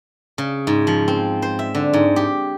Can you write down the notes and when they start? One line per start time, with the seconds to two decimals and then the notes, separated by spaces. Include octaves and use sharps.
0.38 C#3
0.67 G#2
0.87 F3
1.08 C4
1.42 C5
1.59 E5
1.75 D3
1.93 G#2
2.16 G4